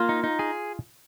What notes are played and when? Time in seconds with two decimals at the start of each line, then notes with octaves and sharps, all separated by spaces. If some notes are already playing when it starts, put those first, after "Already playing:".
Already playing: A#3 F4
0.09 D#4
0.24 D#4
0.39 G#4